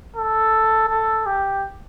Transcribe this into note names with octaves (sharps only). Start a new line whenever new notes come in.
A4
A4
G4